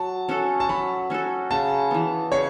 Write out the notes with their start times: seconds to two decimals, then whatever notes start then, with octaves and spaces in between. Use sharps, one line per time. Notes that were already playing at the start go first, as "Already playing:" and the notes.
Already playing: F#3 A5
0.29 C#4 F#4 A4
0.60 A5
0.69 F#3 B5
1.10 C#4 F#4 A4
1.51 C#3 A5
1.91 E3 B3
2.32 C#3 C#5